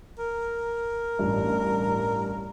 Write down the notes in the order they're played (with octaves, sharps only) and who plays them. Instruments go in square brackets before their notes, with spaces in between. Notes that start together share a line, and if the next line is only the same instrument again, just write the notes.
[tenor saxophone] A#4
[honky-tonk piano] A1 G2